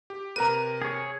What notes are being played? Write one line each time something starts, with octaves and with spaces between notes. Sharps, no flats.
G4
C3 A#4 B4 A#5 D#7
G#4 C#5